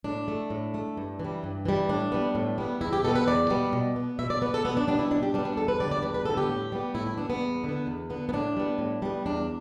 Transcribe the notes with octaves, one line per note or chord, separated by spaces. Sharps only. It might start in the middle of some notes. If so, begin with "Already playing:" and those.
A2 D4
A3
A2
A3
G2
E3
G3
G2
E3 G3
A2 D4
G3 B3
A2
G3 B3
E2 E4
G4
B2 G3 B3 A4
B4
E2 D5
B2 G3 B3
B2
B3
B2 E5
D5
B3 B4
A4
B2 B3
D4
G3 B3 D4
E4
B2 D4
G4
G3 B3 D4
D4
E2 A4
B4
D3 G3 B3 D5
D5
E2 B4
B4
D3 G3 B3 A4
G4
A2
G3 B3
A2 E4
E4
G3 B3 D4
B3
E2
D3 B3
E2
D3 B3
B3
A2 D4
G3 B3
A2
G3 B3
E2 D4